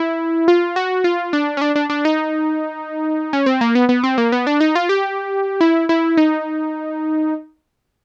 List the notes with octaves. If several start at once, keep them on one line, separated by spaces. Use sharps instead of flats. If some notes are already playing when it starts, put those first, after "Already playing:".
Already playing: E4
F4
F#4
F4
D4
C#4
D4
D4
D4
D#4
C#4
C4
A#3
B3
B3
C4
A#3
B3
D4
D#4
F4
G4
E4
E4
D#4